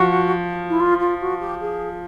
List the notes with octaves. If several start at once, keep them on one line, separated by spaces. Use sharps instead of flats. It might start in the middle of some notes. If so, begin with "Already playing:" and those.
Already playing: F3 F#4
E4
F4
F4
F#4
G4
G#4